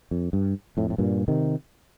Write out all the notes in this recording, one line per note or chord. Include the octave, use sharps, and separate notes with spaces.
F2
G2
F2 A2
A2
G2 A#2
C3 D#3